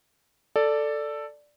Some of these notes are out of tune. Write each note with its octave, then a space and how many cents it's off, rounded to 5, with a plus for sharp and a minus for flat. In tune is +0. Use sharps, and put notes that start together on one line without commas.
A4 +5 D5 +0